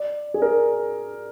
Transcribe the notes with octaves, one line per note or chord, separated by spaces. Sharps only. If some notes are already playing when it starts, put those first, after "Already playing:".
Already playing: D5
G#4
A#4